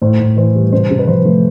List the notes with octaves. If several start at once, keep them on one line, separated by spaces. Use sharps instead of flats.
A2 C5
A2
E3 C5
G3
C3 C5
C3
B4
F3 C5
A3